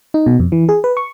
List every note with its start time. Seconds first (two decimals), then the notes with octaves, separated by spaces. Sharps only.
0.14 D#4
0.26 B2
0.40 F2
0.52 E3
0.69 G#4
0.84 B4
0.97 C#6